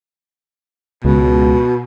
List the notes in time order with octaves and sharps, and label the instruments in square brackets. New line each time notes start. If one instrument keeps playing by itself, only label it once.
[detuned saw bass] C#2 [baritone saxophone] B2